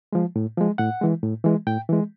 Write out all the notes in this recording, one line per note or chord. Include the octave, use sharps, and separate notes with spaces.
F3 G#3
A2
F3 G#3
A2 F#5
E3 G#3
A2
E3 G#3
A2 G5
E3 G#3